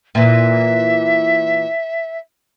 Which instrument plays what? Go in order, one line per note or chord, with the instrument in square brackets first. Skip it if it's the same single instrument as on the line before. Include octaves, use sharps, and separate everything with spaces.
[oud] A#2 E3 [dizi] E5